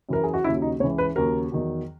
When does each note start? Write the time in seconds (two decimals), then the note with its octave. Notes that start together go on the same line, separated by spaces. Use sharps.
0.09 F#2 E3 A#4
0.24 G#4
0.34 F#4
0.44 D#2 C#3 F#3 E4
0.62 D#4
0.80 C#2 C#3 E3 C#5
0.98 B4
1.16 D#2 C#3 F#3 A#4
1.52 E2 D#3 F#3